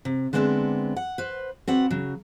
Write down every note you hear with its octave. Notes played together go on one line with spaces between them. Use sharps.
C3
D3 G#3 B3 C4 D4 E5
F#5
B4 C5
C4 F#4 B4 D5 F#5
C#3 F#3